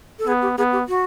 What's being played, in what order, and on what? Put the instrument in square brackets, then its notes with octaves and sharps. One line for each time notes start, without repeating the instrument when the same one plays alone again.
[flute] A4
[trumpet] B3 [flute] G#4
[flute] G4
[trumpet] B3 [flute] G#4
[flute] G4
F#4